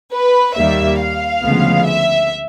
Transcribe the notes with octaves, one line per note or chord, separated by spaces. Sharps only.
B4
D#2 D#3 G3 A#3 E5
F5
D2 C#3 F3 G#3 B3
E5